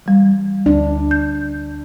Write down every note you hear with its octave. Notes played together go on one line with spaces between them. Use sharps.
E3 G3
D2 D4
G6